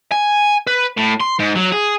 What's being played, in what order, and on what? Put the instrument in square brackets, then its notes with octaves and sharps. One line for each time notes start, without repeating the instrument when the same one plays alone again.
[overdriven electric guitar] G#5
B4
A2
C6
G#2
F#3
G#4